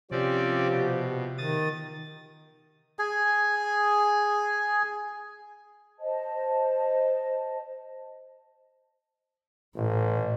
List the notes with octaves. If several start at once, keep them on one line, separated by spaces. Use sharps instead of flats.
C3 F3 C4 C#4 G4 D5
B2
D#3 D#6 A6
G#4 G#5
C5 D#5 A5
A1 A2